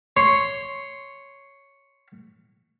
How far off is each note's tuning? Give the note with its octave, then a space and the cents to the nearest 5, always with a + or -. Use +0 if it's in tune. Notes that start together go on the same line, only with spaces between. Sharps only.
C#5 +0 C6 +0